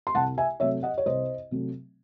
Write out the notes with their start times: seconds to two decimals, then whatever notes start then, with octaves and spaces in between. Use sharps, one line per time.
0.07 C6
0.15 C2 F#5 A5
0.38 E5 G#5
0.60 C3 F#3 A3 C#5 E5
0.83 D#5 F#5
0.98 C#5
1.06 C2 C5 D#5
1.51 C3 F#3 A3